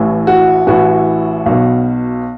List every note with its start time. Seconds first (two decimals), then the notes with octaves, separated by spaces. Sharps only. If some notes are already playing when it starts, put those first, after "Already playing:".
Already playing: A1 A2 E3
0.27 F#4
0.67 A1 A2 E3 F#4
1.46 B1 B2